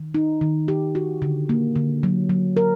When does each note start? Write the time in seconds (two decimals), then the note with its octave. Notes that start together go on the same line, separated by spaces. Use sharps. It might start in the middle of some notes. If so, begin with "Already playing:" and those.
Already playing: D#3
0.14 D#4
0.41 D#3
0.68 G4
0.95 F#4
1.22 D3
1.49 A#3
1.76 D3
2.03 F#3
2.29 F#3
2.57 A#4